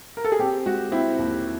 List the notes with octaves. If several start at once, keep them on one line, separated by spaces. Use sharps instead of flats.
A#4
A4
G#4
C4 G4
G#3 F#4
C4 E4
D#2